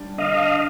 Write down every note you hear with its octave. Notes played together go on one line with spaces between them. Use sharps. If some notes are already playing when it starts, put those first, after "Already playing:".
Already playing: G3 D4
D3 D#5 F5